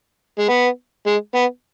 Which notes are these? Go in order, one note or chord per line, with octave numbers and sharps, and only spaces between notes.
G#3
B3
G#3
B3